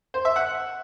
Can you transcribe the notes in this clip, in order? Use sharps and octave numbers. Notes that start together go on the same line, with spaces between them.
C5
E5
F#5